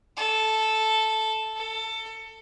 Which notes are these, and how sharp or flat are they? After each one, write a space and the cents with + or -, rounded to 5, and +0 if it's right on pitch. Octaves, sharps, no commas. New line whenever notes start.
A4 -5
A4 +20